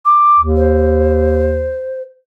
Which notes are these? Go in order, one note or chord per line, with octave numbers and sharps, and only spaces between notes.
D6
D#2
C5